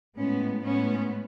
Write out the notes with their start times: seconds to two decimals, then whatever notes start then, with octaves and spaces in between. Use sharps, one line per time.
0.17 A2 G#3 B3 C#4
0.64 A2 G#3 B3 C#4